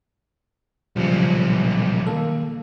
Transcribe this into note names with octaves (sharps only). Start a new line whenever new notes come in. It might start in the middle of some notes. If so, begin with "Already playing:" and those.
B1 A#2 C#3 F3 G3
D#3 A#3 A4